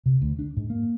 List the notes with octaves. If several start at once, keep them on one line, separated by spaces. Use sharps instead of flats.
C3
D2
D4
G#2
A#3